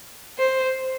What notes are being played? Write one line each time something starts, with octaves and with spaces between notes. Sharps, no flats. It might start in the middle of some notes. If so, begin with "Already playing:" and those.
C5